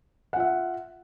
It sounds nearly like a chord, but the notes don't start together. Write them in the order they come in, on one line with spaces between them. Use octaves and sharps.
F#5 F4 E5